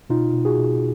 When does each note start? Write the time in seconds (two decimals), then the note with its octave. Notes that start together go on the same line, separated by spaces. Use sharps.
0.10 B2 D#4 F4
0.33 B2
0.45 F#4 G#4
0.57 B2